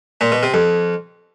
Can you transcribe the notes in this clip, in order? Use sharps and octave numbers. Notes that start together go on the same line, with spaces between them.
A#2
B2
C3
F2